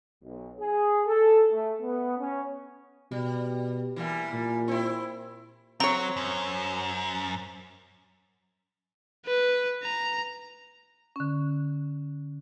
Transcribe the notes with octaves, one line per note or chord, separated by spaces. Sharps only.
B1
G#4
A4
A3
B3
C#4
B2 G3
E3 G3 A#3
A#2
C4 E4
F#3 C4 C#5 A#5
F#2
B4
A#5
D3 C#4